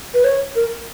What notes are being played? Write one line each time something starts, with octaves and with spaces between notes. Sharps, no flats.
B4
C#5
A#4